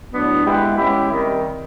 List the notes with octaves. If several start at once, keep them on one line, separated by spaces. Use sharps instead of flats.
A2 F#3 B3 D4
G#3 B3 E4 G4 B4
G#3 C#4 E4 G4
C3 D#3 G3